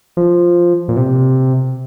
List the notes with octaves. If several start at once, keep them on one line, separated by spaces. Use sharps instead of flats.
F3
A#2
C3